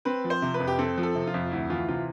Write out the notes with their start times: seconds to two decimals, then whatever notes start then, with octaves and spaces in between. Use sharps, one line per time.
0.05 C4 B4
0.24 F3
0.30 C5
0.42 C3
0.54 B4
0.60 F2
0.67 G4
0.79 C4 A4
0.98 F3
1.03 A4
1.15 C3
1.27 F4
1.34 F2
1.52 D2 E4
1.70 E3 F4
1.88 C3 F4